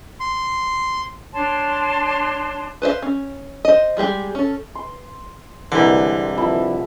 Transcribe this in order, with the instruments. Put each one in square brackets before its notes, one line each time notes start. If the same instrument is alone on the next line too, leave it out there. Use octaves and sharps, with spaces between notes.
[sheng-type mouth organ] C6
[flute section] D4 C#5 A5 C6
[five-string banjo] B4 C5 D5 F5
C#4
C5 D#5
G3 G#3 G4 G#4
C#4 A4
[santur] C6
[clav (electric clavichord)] C2 D3 [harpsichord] E3 [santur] G#3 C4 A#4
[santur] F3 E5 B5